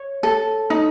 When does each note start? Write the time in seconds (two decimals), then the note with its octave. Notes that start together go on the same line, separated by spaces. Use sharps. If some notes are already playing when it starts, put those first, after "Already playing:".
Already playing: C#5
0.23 A4
0.70 D#4